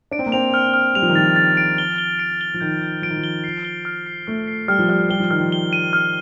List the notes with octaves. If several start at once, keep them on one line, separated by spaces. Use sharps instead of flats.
D4 D7
C4
A#3
C4 F7
F6
F6
G3 F7
F3
D#3
F3 A6
A6
D7
G7
G7
D7
G7
F3
D#3 G6
G6
F3 D7
D#3
F3
G7
C7
G7
F6
C7
A3 F6
C7
G3 F6
F3
G3 F6
G3 G7
F3
D#3 F6
F3
G7
D#7
F6